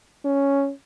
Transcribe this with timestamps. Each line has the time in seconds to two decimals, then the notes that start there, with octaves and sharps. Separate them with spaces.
0.25 C#4